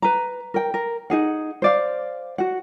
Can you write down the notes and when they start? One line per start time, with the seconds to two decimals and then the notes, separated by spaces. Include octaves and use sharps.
0.02 B4 A#5
0.54 A#4 G5
0.74 A#4
1.10 D#4 G#4 F#5
1.62 C5 D5 F5
2.38 F#4 F#5